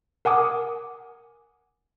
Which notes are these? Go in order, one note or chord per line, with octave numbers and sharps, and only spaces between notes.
A#4 F#5 G#5 D6 D#6